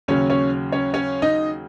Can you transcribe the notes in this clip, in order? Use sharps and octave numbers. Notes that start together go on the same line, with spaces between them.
D#2 C#3 F#3 C#4 C#5
C#4 C#5
C#4 C#5
C#4 C#5
D#4 D#5